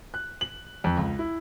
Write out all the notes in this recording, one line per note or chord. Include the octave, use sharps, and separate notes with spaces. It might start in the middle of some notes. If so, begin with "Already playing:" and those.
F#6
F#7
F2
C#2
E4